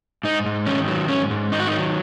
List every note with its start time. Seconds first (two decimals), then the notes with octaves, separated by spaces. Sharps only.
0.23 G#2 D#4
0.46 G#2
0.66 D#3 C#4
0.88 F#3
1.09 G#2 C#4
1.31 G#2
1.52 D#3 D#4
1.60 F#4
1.67 D#4
1.73 F#3